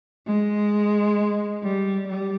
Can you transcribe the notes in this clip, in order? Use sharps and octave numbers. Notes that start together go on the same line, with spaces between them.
G#3
G3
G3